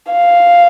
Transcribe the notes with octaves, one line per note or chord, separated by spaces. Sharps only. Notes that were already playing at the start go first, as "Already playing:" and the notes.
F5